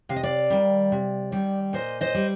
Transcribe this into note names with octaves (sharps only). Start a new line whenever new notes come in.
C3 F5
D#5
D5 F5
D#3 G3
C3
D#3 G3
A#2 C5 D#5
C5 D#5
G3